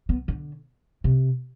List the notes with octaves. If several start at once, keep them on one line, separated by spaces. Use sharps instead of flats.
B3
D3
C3